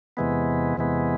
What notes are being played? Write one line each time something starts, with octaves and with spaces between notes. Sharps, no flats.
E2 C3 E3 G#3 B3
E2 C3 E3 G#3 B3